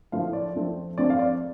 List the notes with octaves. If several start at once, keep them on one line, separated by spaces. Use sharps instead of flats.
A2 F3 A3 F5
D5
F2 F3 A3 C4
F2 F3 A3 C4 D5
F5
D5